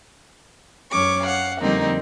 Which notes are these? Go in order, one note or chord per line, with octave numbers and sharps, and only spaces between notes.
F#2 C#4 C#6 D6
F5 F#5
F2 D3 G3 A#3 C4 D#4